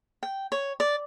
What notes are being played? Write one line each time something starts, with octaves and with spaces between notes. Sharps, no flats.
G5
C#5
D5